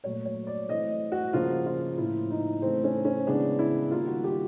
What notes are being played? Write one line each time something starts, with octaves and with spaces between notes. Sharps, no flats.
A#2 F#3 A3 C#5
C#5
D5
E3 A3 C4 D#5
F#4
C#3 F3 A#3 F4
F4
A2 F3 A#3 E4
D#4
C#3 E3 A3 C4
C#4
C#4
C#3 E3 G#3 B3 D4
E4
D#3 G3 A#3 F4
F#4
G4